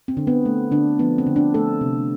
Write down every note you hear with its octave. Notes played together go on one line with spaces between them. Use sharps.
C4
D3
B3
A3
D3 D4
F3 B3
C4
D3
D4
A3 A4
C3